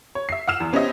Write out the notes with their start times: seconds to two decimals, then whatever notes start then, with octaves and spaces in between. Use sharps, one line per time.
0.15 C#5
0.29 E5 C7
0.48 F#5 E6 F6 E7
0.60 E2
0.73 B3 C#4 G4 C5 D#5 E5